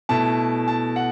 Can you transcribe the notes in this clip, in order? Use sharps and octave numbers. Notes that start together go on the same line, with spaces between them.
B2 A3 E4 A5
A5
F#5